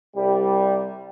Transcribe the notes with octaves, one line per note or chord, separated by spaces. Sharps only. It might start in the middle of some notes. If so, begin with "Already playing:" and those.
C2 G3